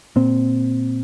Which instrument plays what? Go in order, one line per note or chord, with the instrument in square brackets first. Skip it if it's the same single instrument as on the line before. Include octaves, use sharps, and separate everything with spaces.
[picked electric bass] A#2 C4